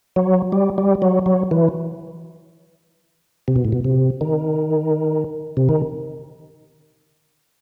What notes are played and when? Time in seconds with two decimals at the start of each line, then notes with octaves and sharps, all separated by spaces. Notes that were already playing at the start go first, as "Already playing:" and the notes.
0.16 F#3
0.52 G3
0.78 G3
1.02 F#3
1.26 F#3
1.51 E3
3.48 C3
3.56 B2
3.65 A2
3.72 B2
3.84 C3
4.21 D#3
5.57 C3
5.69 D#3